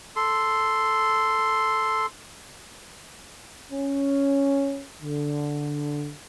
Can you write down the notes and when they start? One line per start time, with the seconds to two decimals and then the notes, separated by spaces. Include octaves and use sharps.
0.16 A4 C6
3.72 C#4
5.02 D3